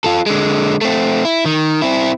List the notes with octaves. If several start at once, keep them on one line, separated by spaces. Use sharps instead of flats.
F4 A4
D3 G#3
A3 C4
E4
D#3
C4 E4